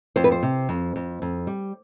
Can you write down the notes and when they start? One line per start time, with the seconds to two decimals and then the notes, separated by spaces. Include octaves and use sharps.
0.16 F2 C5
0.24 B4
0.32 C5
0.43 C3
0.69 F2
0.96 F2
1.22 F2
1.47 G3